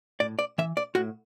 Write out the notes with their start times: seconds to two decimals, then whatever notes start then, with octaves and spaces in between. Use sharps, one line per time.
0.20 A2 D5
0.39 D5
0.58 E3 E5
0.77 D5
0.95 A2 F#4